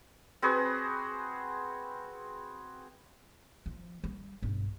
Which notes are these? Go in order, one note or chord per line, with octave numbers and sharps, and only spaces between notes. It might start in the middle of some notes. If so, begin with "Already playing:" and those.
C4 F#4 G#4 B4
F3
G3
B1 G2